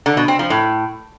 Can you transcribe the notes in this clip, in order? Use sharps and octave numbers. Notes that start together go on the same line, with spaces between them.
D3
B2
C4
F3
A2